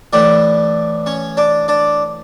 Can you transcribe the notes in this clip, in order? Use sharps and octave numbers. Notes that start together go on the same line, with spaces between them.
A2 E3 D4 D5
C#4 C#5
D4 D5
D4 D5